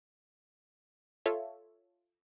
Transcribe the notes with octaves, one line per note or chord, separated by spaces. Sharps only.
F4 A4 C#5 E5